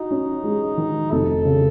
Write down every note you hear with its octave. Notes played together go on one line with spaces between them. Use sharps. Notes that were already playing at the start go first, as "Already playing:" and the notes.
Already playing: D#4 F#4
C#4
G#3
D#3
F1 A4
C#3